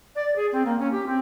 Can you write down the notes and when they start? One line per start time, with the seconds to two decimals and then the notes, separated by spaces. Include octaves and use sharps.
0.15 D5
0.35 G#4
0.52 C4
0.65 A#3
0.79 C#4
0.91 G4
1.06 C4